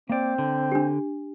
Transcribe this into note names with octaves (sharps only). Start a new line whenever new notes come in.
A#3 C4 D5
D3
D4 G4